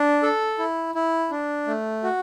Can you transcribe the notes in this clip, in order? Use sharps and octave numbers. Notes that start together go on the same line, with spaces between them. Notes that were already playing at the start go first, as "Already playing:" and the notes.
Already playing: D4
A4
E4
E4
D4
A3
F#4